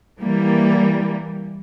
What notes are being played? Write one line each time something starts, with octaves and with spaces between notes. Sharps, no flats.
E3 G3 A#3